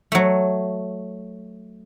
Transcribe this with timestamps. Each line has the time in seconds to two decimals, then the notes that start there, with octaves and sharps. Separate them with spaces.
0.12 F#3 A3